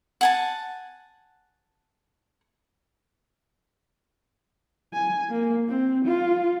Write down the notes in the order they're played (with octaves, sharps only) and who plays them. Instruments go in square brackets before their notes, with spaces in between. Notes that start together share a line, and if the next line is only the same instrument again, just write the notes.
[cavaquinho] F#5 G#5 A5
[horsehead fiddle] G#5
A#3
C4
F4